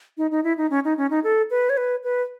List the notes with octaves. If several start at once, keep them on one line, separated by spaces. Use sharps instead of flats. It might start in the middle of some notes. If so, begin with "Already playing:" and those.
D#4
D#4
E4
D#4
C#4
D#4
C#4
D#4
A4
B4
C#5
B4
B4